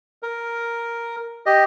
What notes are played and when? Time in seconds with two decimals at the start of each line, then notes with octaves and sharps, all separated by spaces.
0.23 A#4
1.46 G4 D#5